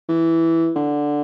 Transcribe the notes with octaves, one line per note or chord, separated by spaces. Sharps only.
E3
D3